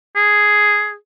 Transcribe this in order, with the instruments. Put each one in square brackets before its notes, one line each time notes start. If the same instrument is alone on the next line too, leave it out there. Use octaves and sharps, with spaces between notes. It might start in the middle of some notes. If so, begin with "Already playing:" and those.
[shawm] G#4